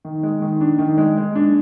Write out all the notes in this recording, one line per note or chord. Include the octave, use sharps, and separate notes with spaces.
D#3
G#3
D#3
D4
D#3
G#3
G#3
D4